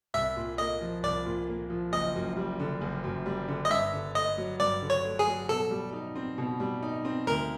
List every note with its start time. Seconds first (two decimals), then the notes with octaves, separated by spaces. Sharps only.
0.14 C2 E5
0.36 A#2
0.58 A#3 D#5
0.81 F3
1.03 C2 D5
1.26 A#2
1.48 A#3
1.70 F3
1.92 F#1 D#5
2.15 F#2
2.37 G3
2.59 D3
2.81 F#1
3.04 F#2
3.26 G3
3.48 D3
3.65 D#5
3.71 G2 E5
3.93 D3
4.15 A3 D#5
4.38 F#3
4.59 G2 D5
4.82 D3
4.90 C#5
5.04 A3
5.19 G#4
5.27 F#3
5.49 B2 A4
5.71 G3
5.93 D#4
6.15 C4
6.38 B2
6.60 G3
6.83 D#4
7.05 C4
7.27 D2 A#4